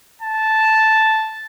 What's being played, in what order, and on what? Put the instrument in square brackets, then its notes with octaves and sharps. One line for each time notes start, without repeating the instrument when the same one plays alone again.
[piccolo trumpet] A5